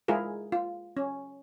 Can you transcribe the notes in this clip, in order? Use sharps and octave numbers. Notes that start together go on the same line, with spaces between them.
G#3 E4 F4 G#4 A#4
F4
C#4